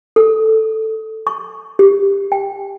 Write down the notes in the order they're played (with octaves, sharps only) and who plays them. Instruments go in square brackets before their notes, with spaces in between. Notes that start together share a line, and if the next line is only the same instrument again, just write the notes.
[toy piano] A4
C#6
G4
G5